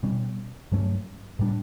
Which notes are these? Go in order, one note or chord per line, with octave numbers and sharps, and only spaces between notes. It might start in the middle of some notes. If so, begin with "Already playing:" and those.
B2 G3 C#4
G2 F#3 A3 C#4
A2 G3 D4